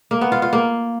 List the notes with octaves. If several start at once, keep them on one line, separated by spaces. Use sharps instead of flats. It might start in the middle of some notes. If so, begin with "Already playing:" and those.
A#3
B3
F4
F4
A#3